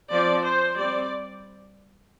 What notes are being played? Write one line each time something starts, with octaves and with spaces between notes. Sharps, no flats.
F3 C4 D5
C5
G3 C4 D5